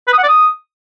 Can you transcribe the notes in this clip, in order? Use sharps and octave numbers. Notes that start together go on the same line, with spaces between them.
B4
D#6
F#5
D5
D#6